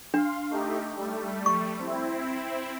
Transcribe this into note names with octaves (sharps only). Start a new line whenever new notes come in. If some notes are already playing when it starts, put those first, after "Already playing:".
D4 F5 C6
A3 D#4 G4
G3 A3
C#6
C4 E4